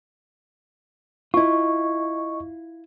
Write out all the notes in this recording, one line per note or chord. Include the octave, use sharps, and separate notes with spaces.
E4 F4 D#5 C#6